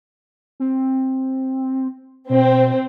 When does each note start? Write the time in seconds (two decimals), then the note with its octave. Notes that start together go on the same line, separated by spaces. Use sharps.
0.60 C4
2.30 B2 C4